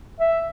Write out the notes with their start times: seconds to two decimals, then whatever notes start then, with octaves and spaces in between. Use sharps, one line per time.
0.20 E5